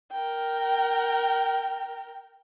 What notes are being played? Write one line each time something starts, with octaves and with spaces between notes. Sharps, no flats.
A#4 G5